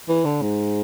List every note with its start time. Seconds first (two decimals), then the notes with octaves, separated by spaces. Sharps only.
0.09 E3
0.25 D3
0.42 G#2